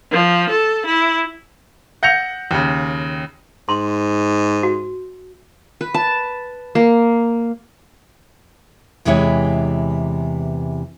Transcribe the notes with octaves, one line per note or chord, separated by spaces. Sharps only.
F3
A4
E4
F#5 G6 A#6 C#7 F7
D#2 C#3
G#2 C6
F#4
B4
A5
A#3
E2 C3 E3 G#3 E4 C#5